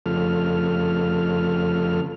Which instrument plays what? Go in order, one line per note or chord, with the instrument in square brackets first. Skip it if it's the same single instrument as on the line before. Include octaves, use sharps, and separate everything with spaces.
[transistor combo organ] F2 C#3 F3 A3 A4 F6